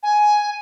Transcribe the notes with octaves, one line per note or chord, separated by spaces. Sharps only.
G#5